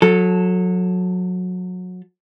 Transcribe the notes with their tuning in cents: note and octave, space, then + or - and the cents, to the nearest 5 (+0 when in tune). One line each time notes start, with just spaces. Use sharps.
F#3 -25 A4 +0